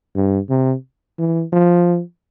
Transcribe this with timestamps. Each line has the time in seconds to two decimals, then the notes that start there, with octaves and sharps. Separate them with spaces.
0.15 G2
0.50 C3
1.19 E3
1.53 F3